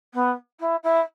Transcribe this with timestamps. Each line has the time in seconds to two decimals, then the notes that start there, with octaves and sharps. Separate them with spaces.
0.14 B3
0.59 E4
0.83 E4